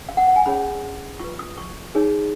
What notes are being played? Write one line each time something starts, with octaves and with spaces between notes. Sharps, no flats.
F5
F#5
F#5
G#5
C#4 G#4 C#5 B5
F4 B4 C#6
D#6
C#6
D#4 G#4 C#5